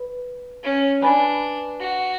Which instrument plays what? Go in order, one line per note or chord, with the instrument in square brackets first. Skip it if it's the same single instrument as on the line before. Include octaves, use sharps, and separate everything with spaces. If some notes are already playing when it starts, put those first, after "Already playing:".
Already playing: [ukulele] B4
[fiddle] C#4
[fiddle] D4 [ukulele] B4 D5 G#5 B5
[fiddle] F#4